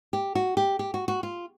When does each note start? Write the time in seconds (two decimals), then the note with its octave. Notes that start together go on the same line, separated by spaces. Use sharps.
0.13 G4
0.35 F#4
0.57 G4
0.79 G4
0.94 F#4
1.08 F#4
1.23 F4